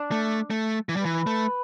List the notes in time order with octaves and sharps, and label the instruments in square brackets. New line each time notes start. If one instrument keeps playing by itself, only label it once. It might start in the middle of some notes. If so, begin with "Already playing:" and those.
Already playing: [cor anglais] D4
[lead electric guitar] A3
A3
E3
G3
[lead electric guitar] E3 [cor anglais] B4
[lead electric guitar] A3